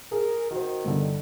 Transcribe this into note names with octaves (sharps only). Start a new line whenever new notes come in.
G#4 A#4
D#3 F#4 C5
G1 D3